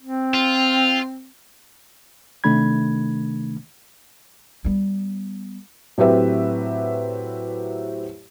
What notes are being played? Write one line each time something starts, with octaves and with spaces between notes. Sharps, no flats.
C4
F4
C3 D#3 A3 D4 B5 G#6
G3 B3
A2 F#3 C4 G4 B4 E5